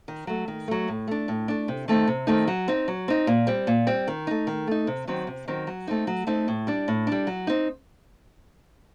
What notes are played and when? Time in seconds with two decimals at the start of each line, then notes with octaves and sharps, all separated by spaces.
0.08 D#3
0.27 F#3 A3
0.48 D#3
0.68 F#3 A3
0.88 A2
1.07 A3 D4
1.28 A2
1.48 A3 D4
1.68 C3
1.88 D#3 A3 C4 D#4
2.07 C3
2.27 D#3 A3 C4 D#4
2.47 F#3
2.68 C4 D#4
2.88 F#3
3.08 C4 D#4
3.27 A#2
3.47 G3 C4
3.67 A#2
3.87 G3 C4
4.08 D#3
4.27 A3 D#4
4.47 D#3
4.67 A3 D#4
4.87 C3
5.07 D#3 F#3 C4
5.27 C3
5.48 D#3 F#3 C4
5.67 F#3
5.87 A3 C4 D#4
6.07 F#3
6.27 A3 C4 D#4
6.48 A2
6.67 G3 D4
6.88 A2
7.07 G3 D4
7.27 F#3
7.47 C4 D#4